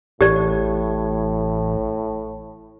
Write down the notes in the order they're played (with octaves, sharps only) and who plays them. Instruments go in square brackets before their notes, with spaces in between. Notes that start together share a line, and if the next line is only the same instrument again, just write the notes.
[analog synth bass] A1 [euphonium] A2 [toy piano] G4 D5